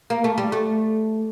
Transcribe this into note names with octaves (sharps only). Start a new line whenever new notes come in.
A#3
A3
G3
A3